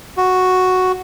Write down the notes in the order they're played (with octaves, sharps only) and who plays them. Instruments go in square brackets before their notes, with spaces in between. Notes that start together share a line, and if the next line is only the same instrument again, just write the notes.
[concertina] F#4